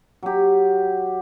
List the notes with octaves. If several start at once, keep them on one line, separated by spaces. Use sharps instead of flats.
F#3 G4